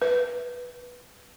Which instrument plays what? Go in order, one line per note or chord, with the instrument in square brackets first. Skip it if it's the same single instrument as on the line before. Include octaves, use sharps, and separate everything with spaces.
[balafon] B4